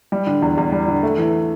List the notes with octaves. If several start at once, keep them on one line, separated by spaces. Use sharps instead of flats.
G3
D3
E2
E2
G3
D3
A3
E3